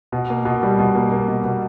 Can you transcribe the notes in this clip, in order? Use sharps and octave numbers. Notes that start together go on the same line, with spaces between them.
B2
A#3
B2
G3
B2
A#3
A#3
B2
B2